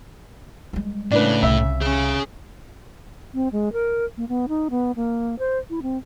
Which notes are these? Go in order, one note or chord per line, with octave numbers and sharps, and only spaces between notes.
G3 G#3
A2 C#3 D4 B4
C2 C3 E5
C#4 G#4 F5
C4
G#3
A#4
A#3
B3
D#4
B3
A#3
C5
E4
C4